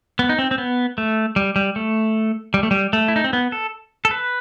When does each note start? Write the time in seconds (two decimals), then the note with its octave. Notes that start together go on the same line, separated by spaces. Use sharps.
0.19 B3
0.29 D#4
0.39 C4
0.51 C4
0.58 B3
0.98 A3
1.36 G3
1.56 G3
1.76 A3
2.54 G3
2.63 A3
2.71 G3
2.93 A3
3.08 E4
3.16 D#4
3.24 C4
3.33 B3
3.52 A4
4.05 A4
4.11 B4